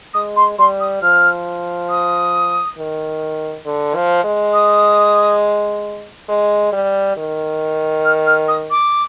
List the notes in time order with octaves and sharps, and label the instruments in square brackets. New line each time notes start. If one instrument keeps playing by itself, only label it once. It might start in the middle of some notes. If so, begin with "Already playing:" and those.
[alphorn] G#3 [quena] D#6
[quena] C6
[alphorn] G3 [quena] C6
[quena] D#6
[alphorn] F3 [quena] F6
[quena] D#6
[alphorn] D#3
D3
F3
G#3
[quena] D#6
[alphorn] G#3
G3
D#3
[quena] F6
F6
D#6
D6